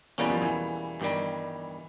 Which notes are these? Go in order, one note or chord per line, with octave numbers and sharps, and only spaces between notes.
E2 B2 E3 G3 A#3 C#4
F3
E3
G1 G2 D#3 G3